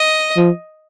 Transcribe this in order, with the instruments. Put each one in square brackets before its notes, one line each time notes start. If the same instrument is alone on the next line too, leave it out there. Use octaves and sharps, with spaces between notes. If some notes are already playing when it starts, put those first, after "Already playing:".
Already playing: [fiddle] D#5
[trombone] F3